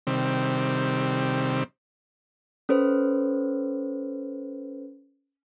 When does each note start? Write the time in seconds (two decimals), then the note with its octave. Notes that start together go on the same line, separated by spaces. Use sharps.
0.07 C3 D#3 G3 C4
2.69 C#4 A4 B4 C5